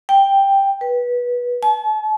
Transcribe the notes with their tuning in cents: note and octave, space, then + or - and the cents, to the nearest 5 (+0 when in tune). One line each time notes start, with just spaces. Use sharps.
G5 +5
B4 -20
A5 -45